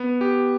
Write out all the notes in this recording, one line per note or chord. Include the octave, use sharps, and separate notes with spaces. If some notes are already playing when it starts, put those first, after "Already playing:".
Already playing: B3
G4